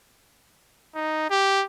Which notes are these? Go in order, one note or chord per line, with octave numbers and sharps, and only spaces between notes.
D#4
G4